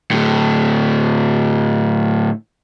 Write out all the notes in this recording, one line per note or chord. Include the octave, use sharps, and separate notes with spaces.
A2 D3